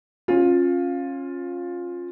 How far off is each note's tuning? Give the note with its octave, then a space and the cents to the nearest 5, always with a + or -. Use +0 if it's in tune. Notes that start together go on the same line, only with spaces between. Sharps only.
C#4 -25 F4 +10